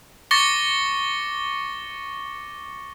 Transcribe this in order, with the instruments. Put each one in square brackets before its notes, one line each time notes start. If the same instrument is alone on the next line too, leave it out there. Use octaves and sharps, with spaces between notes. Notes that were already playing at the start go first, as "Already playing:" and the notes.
[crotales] C#6 D6 A6 A#6 C#7 G7